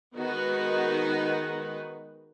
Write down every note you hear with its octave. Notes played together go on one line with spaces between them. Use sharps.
D#3 G#3 B3 D#4 F#4 B4